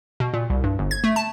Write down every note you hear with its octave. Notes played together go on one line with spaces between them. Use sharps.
B2
A#2
C2
G2
G1
G#6
A3
A5